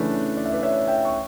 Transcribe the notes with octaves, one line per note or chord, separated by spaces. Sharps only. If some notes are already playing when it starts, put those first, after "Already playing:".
Already playing: C#3 E3 A3 D4 B4
D5
E5
B4 D5
C#5 E5
E5 G5
C#6